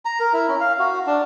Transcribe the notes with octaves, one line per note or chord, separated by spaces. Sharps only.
A#5
A#4
E4
C#4
F5
F#4
D4